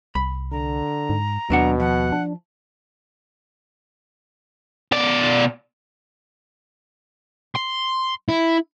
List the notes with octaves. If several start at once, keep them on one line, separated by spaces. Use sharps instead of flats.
C2 B5
D3 A#5
G#2
D#2 B2 F#3 D4 F#5
F3 F#5
D4
B2 D5
C6
E4